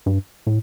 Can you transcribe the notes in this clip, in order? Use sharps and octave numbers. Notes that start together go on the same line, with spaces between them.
G2
A2